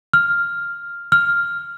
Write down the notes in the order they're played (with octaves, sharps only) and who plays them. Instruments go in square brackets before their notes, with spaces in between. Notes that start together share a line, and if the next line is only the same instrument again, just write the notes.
[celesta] F6
F6